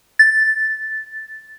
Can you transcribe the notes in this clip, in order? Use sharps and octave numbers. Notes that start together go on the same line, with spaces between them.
A6